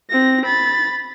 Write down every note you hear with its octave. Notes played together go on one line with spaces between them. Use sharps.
C4 A#6
B5 A6